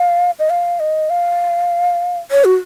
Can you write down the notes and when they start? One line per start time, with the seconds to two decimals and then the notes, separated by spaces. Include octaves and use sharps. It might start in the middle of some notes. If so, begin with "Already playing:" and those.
Already playing: F5
0.39 D#5
0.50 F5
0.80 D#5
1.10 F5
2.31 C#5
2.45 F#4